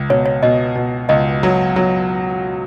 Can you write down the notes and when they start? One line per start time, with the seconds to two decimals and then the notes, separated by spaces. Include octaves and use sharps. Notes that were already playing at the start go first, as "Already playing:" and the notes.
Already playing: C#2
0.10 B2 C#5
0.26 C#5
0.43 B2 D#5
0.75 B2
1.09 C#2 D#5
1.43 F#3
1.76 F#3